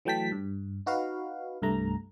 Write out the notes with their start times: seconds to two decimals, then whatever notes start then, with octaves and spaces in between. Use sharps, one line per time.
0.05 E3 F#3 A3 G5 A5 B6
0.32 G2
0.86 D#4 F#4 B4 F5
1.62 C2 G2 A3 A#5